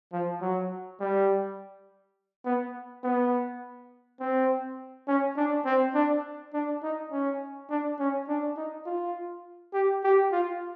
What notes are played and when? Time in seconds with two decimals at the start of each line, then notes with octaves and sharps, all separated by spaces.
0.13 F3
0.41 F#3
1.00 G3
2.45 B3
3.03 B3
4.20 C4
5.08 C#4
5.37 D4
5.65 C4
5.95 D4
6.54 D4
6.83 D#4
7.12 C#4
7.70 D4
7.99 C#4
8.28 D4
8.57 D#4
8.86 F4
9.73 G4
10.04 G4
10.32 F4